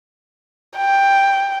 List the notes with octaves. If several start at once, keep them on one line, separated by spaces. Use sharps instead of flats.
G5